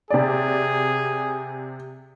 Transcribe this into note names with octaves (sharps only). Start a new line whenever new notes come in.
C3 G#4 D5